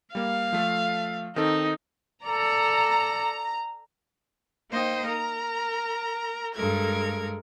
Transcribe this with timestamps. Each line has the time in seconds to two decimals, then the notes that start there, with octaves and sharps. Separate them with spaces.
0.15 G3 A#3 F5
0.53 F3 A3 A4
1.36 D#3 C4 D#4 A4
2.26 A4 D5 A#5
4.70 A#3 D#4 C5 D#5 G5
5.06 A#4 A#5
6.55 G2 G#3 A4 A#4 G#6